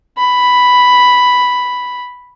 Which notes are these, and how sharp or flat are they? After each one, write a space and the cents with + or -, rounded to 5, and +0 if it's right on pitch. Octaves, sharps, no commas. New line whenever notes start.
B5 +0